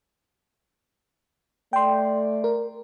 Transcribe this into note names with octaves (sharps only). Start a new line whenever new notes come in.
A3 D5 G5 C6
A#4